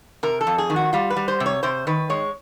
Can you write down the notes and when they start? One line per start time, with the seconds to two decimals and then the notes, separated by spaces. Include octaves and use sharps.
0.23 C3 A#4
0.41 A4
0.47 F2
0.58 G#4
0.70 D#3
0.76 F#4
0.93 G3 F4
1.10 B4
1.17 G3
1.28 C5
1.40 C3
1.46 C#5
1.63 C3 C5
1.87 D#3 B4
2.10 G#3 C#5